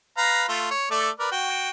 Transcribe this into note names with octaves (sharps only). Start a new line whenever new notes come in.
B4 F5 A#5
A3 F4
C#5
A3 A4 D5
A#4 B4 D5
F#4 G5